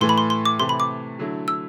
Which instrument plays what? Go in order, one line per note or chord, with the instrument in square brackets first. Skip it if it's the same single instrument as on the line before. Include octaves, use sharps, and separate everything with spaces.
[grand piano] A2 E3 A3 [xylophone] C6
[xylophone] B5
C6
C6
D6
[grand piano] C3 E3 A3 [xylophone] C6
[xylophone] B5
D6
[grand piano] D3 F#3 A3 E4
[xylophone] E6